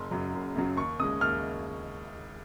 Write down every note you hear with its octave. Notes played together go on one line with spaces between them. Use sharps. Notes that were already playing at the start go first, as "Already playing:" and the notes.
Already playing: F#1 C6
F#2 C#3 F#3
F#1
F#2 C#3 F#3
D#2 C#6
C#3 G#3 D#6
D#2 F6